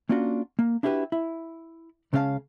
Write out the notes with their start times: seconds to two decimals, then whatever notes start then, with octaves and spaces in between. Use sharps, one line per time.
0.09 A#3 C#4 D4 F4 F#4
0.59 A#3
0.83 D4 E4 F#4 G4 A4 B4
1.12 E4
2.13 C#2 C#3 C#4 E4 F5 A5